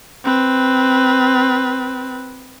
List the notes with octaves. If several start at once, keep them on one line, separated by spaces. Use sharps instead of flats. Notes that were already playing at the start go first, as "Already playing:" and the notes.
C4 B4